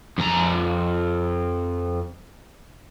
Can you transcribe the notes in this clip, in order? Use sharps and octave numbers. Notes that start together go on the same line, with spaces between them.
F2 A#5